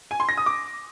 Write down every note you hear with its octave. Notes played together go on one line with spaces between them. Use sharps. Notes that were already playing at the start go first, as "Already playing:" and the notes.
G#5
C6
A#6
D#6
D6